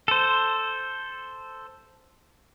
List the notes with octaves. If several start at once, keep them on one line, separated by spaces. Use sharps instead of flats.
A4 C5